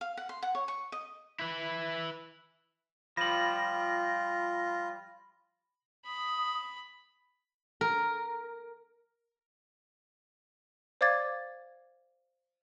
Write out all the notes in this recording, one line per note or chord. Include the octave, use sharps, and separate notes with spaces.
F5
F#5
C6
F#5
C#5
C#6
D#5
E4 B4
F3 G3 F4 B5 A#6 F#7
B5 D#6
A#4
C5 D5 F5 D6 G#6 A6